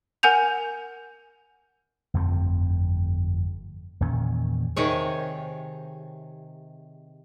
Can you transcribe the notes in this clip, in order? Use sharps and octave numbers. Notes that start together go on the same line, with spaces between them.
A#4 F#5 G#5 G6 F7
G1 F2 A3 C4
E2 A#2 D#3 C#4
C3 D#3 G#4 C#5